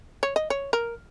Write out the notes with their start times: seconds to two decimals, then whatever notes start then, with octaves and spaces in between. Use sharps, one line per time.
0.23 C#5
0.36 D#5
0.50 C#5
0.73 A#4